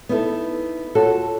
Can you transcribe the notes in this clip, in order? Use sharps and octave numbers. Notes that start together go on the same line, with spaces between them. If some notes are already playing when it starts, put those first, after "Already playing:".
B3 D#4 E4 A4
F4 F#4 A4 C#5